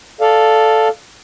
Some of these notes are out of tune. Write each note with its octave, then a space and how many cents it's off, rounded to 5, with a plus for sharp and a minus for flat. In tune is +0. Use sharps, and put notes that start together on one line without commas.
A4 +0 D5 +5 F5 +0